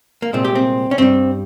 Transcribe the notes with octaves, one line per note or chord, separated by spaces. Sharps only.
A#3
C2 A#2 G#3 C4
G4
C4
C#4
G2 G3 C4